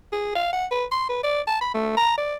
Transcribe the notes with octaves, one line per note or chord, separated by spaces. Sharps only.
G#4
F5
F#5
B4
C6
B4
D5
A5
B5
A3
A#5
D5